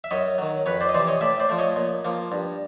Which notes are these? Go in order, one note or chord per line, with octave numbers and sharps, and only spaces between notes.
E5
F#2 C#5 D#5
D#3 F#3
F2 B4 C#5
C5 D5
D#5
C3 E3 C5 D5
C#5 D#5
A2 D5 E5
C5 D5
F3 A3
C#5 D#5
A#2
F3 A#3
G2